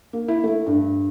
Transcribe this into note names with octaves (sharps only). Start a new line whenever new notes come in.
A#3
E4
A3
G2